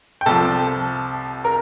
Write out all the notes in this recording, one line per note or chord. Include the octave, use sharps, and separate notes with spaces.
G5
C2 C3 F3 A4 A5
A#4 A#5